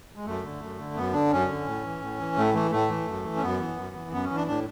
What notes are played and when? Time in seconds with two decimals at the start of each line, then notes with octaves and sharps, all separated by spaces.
0.16 G#3
0.25 F#2 A3
0.43 D3
0.60 F#2
0.79 D3
0.96 F#2 B3
1.13 D3 D4
1.31 F#2 C#4
1.48 D3
1.66 A2
1.84 E3
2.01 A2
2.19 E3
2.37 A2 A3
2.54 E3 A3
2.71 A2 A3
2.89 E3
3.07 F#2
3.24 E3
3.36 C#4
3.42 F#2 B3
3.60 E3
3.77 F#2
3.95 E3
4.12 F#2 B3
4.24 C#4
4.30 E3
4.36 D4
4.47 A2 D4